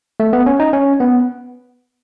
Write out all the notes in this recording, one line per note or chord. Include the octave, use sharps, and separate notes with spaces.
A3
B3
C#4
D#4
C#4
B3